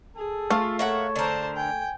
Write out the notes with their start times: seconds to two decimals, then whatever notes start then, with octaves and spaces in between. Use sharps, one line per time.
0.17 G#4 A4
0.50 A3 F4
0.79 A#3 A4 C#5 E5 F#5
1.16 D3 A#4 C5 A5
1.56 G5 G#5